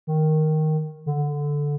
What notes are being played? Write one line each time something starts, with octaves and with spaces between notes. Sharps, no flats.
D#3
D3